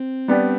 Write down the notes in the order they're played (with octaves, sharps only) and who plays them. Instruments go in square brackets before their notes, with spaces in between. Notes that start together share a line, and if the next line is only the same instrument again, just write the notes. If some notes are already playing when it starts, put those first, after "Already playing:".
Already playing: [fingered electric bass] C4
[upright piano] G3 B3 D4 G4